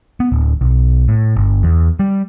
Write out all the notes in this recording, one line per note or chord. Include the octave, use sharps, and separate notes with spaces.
B3
D1
B1
A2
G1
E2
G3